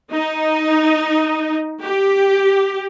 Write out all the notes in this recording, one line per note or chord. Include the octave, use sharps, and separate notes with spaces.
D#4
G4